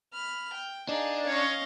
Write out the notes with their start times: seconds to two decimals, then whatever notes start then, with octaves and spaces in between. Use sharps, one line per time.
0.13 B5 F6
0.54 G5
0.89 D4 D#4 G#4 F5
1.27 C#4 C#5 D#5 F5 C#6